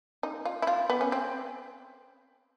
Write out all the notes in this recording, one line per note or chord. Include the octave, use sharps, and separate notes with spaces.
D#4
F4
E4
F4
B3
C#4
C4